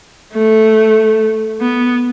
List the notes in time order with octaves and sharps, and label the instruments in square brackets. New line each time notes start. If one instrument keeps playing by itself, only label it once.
[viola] A3
B3